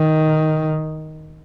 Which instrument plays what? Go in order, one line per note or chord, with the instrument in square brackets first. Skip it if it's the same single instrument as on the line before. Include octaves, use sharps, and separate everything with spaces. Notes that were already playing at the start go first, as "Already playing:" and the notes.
Already playing: [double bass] D#3